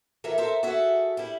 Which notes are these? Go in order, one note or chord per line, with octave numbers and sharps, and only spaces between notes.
E3 A4 A#4 E5
A4 A#4 C5 E5
F#4 G#4 A4 E5
G3 E4